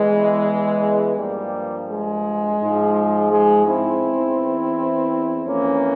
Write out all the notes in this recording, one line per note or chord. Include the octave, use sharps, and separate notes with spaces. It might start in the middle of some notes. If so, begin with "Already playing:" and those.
Already playing: E2 E3 G#3
G2 F3 G3 A#3
G#3
G#2 F3
G#3
C4 E4
E2 E3
F2 E3 A#3 C#4